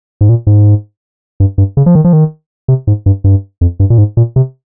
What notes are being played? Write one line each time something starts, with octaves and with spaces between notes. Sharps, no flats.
G#2
A#2
G#2
G2
G2
C#3
F3
D#3
F3
D#3
C3
G#2
G2
G2
F2
G2
A#2
G#2
A#2
C3